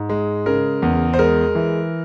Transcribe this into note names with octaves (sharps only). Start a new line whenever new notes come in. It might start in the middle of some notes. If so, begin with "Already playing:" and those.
Already playing: G#2
G#3
C#3 A#4
E2
C5
G#3 A#4
E3